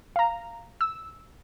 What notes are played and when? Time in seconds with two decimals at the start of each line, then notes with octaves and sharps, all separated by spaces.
0.16 F5 A#5
0.81 E6